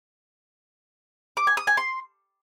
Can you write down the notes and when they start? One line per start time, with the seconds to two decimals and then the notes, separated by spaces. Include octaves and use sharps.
1.37 D6
1.47 G#5
1.57 D#6
1.67 G#5
1.77 C6